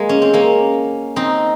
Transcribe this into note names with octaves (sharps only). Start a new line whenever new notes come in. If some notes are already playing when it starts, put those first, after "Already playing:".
Already playing: G#3 A#3
C#4
C4
A#3 C#4
C4 D#4